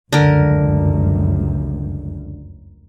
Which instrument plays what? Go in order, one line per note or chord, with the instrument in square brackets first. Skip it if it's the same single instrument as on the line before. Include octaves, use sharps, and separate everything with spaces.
[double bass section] F1 C#2 F#2 [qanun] D3 A#4